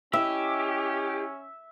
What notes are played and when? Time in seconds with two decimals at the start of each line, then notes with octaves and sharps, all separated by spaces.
0.13 C#4 E4 G4 D#5 E5